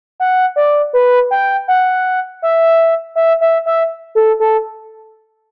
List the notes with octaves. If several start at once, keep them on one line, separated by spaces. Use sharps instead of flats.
F#5
D5
B4
G5
F#5
E5
E5
E5
E5
A4
A4